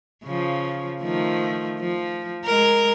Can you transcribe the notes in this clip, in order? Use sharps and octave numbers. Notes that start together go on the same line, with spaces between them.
C#3 F3
D#3 F3 A3
F3
G#3 A#4